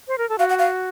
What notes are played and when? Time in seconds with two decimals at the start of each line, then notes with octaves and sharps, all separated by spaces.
0.08 C5
0.18 A#4
0.29 A4
0.38 F#4 F5
0.49 F#5
0.59 F5